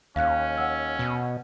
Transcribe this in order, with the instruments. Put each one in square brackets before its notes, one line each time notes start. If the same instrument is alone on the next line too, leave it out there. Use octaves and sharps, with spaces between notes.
[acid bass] D#2 [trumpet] C#4 [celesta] F5 F#6
[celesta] F#5 E6 G#6
[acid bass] B2